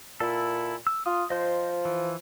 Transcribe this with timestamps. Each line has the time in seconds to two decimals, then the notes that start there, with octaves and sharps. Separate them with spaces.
0.20 A#2 E4 A4
0.87 E6
1.06 F4 D#6
1.30 F3 C5 D#5
1.85 E3